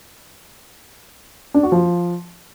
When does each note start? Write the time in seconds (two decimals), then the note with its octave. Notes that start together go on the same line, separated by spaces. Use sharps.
1.54 D4
1.63 F#4
1.72 F3